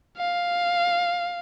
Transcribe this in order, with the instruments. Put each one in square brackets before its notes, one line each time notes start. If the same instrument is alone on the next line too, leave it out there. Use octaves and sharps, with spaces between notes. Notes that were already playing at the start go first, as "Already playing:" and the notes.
[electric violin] F5